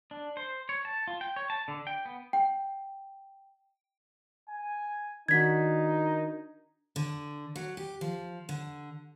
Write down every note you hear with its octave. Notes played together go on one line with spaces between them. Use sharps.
D4
C5
C#5
A5
F4
G5
C#5
A5
D3
G5
B3
G5
G#5
D#3 D4 D#4 F#4 G#6 B6
D3
F#3
G4
F3
D3